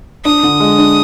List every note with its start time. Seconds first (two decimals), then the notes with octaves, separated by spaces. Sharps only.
0.25 D4 D#6
0.43 D3
0.60 G#3
0.78 D4